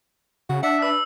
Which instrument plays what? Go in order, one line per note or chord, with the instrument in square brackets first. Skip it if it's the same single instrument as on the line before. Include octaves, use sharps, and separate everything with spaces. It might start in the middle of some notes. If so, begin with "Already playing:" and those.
[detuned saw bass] C#3 [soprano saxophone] F#4
[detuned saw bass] D4 [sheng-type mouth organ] E5 [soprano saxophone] F#5
[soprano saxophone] B4 [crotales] E6